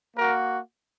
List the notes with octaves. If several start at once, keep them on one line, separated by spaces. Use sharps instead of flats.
A#3 F#4 A#4